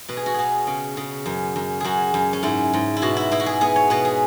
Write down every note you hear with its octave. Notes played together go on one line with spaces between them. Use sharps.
B2 B4
G#4
F#4
B2 G#4
C#3
C#3
F#2
F#2
F#2 F#4 G#4
F#2
C#4
G#2 E4
G#2
E4
B2 F#4
E4
B2 E4
F#4
G#4
B3 G#4
C#5
B2 B4
G#4